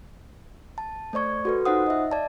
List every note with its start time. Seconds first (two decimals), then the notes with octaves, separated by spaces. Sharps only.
0.78 A5
1.13 A3 C5 D5 C#6 G#6
1.45 F#4 A4 B4
1.65 D#4 F4 C5 F#5 D#6
1.87 D#5 E5
2.11 D5 A5